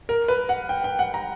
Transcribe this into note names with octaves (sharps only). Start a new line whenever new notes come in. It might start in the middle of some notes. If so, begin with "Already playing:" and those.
A#4
B4
F#5
G5
G5
F#5
A#5